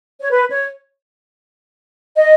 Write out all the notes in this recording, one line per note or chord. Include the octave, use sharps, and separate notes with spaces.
C#5
B4
C#5
D#5